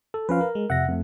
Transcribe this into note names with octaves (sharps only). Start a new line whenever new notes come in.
A4
F3 C#4 F4 B4 F5
A#4
G#3
F2 C3 E5 F#5 A#6
F2 A3